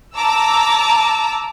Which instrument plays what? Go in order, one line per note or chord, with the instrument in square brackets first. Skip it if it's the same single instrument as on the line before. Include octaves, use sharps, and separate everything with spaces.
[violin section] A5 A#5 D6 E6